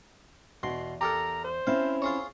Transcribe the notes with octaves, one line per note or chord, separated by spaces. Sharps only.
E2 G#2 B2 C6
G4 A4 A#4 A#5
C5
C4 C#4 E4 F5
F4 G#4 C#5